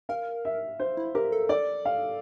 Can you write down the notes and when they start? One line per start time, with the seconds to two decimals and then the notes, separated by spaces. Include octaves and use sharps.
0.09 A#4 F5
0.45 E5
0.79 C5
0.97 E4
1.15 G4 A#4
1.32 A4
1.49 D5
1.85 F5